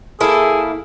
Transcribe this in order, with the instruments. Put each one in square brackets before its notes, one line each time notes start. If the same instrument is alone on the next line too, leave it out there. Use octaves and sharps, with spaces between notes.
[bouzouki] A#3 E4 A4 [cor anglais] G#4